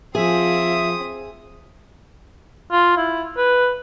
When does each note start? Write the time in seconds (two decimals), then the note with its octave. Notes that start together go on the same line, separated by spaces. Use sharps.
0.15 F3 C4 G#4 E5 D#6
2.72 F4
2.97 E4
3.37 B4